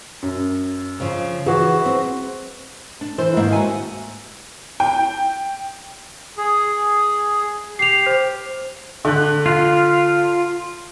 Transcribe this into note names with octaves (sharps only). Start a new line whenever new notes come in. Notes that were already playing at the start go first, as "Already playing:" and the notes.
F#2
C#3 F3
E3 F#4 G#4
C4
D4
E3 C5
G#2 D#3 A#3 E5
F#4 G#5
G5
G#4
G4 C7 F7
C5
D3 F#6
F4